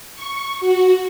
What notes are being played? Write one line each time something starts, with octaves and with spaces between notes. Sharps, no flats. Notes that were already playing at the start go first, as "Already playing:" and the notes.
C#6
F#4